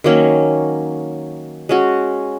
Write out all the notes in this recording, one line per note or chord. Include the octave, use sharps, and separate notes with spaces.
D#3 F#3 A#3 C#4
G#3 C#4 F#4